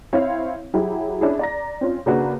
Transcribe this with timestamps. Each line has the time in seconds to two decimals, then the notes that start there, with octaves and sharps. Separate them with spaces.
0.13 C4 E4 C#5 F5
0.74 F#3 E4 G4 G#4
1.21 C#4 D4 E4 G#4
1.39 D5 A#5 A#6
1.81 C4 C#4 F4
2.06 C#3 A#3 D4 F#4 B4